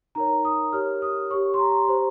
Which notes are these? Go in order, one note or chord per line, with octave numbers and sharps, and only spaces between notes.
D#4 A#4 C#5 A#5
D#6
G4 A#4 C#5 F6
D#6
G4 C#5 C#6
C6
A#5
G4 C5